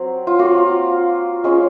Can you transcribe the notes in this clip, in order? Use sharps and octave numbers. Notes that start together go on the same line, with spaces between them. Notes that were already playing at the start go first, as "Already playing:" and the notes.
Already playing: F#3 C4
F4
A#3 F4 F#4
G#3 C#4 F4